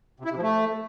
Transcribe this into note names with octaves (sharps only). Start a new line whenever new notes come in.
C3
E4
C3
F3
A3